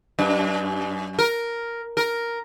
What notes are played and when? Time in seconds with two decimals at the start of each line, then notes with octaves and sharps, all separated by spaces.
0.19 F#2
1.19 A#4
1.97 A#4